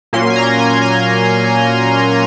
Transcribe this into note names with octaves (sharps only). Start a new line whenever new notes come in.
A#2 F#3 A#3 C#4 C6
G#5
A#5
G#5
G#5